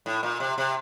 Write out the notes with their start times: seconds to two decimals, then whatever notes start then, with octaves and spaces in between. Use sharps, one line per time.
0.06 A2
0.23 A#2
0.40 C3
0.58 C3